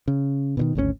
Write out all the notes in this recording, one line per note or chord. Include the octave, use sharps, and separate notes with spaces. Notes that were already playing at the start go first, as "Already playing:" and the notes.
C#3
B2 D3 D#3
G#1 D2 B2 C#4